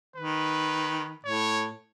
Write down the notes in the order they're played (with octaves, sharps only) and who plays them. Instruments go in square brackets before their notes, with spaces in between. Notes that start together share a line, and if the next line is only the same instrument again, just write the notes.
[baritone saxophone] D#3 [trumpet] B4
[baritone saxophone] A2 [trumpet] C#5